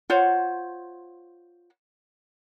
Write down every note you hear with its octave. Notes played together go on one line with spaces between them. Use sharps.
F4 C5 C#5 F#5